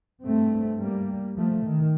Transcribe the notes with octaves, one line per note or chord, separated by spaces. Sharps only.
G2 A3 C4
G3 A#3
F3 A3
D#3